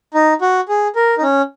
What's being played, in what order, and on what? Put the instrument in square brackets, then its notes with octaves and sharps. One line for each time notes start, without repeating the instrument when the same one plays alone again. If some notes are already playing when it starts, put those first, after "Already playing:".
[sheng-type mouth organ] D#4
F#4
G#4
A#4
D#4
C#4